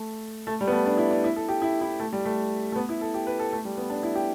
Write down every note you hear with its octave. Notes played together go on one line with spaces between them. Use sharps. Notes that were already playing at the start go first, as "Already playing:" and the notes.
Already playing: A3
A3
G3
B3
A3
D4
E4
D4
E4
A4
G4
E4
E4
A3
G3
A3
A3
B3
E4
A4
G4
B4
A4
A3
G3
B3
D4
E4
G4